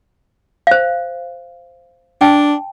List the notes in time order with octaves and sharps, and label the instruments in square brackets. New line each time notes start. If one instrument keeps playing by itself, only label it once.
[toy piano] C5 F5
[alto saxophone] D4 [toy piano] G5 A5